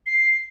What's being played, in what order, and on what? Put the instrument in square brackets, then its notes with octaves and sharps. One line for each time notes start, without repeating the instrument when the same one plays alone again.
[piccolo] C7